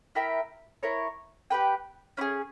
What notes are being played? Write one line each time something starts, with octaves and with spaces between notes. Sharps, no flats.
E4 A#4 E5 G5
E4 A#4 C#5
G4 B4 G5
C#4 E4 G#4